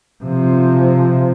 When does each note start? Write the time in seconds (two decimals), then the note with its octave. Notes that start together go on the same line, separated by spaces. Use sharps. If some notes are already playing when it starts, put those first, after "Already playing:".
0.24 C3 F3